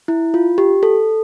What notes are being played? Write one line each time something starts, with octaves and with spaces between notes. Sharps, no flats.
E4
F4
G4
A4